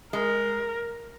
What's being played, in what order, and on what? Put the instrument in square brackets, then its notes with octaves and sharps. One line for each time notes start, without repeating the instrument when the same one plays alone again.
[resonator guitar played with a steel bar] G#3 [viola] A#4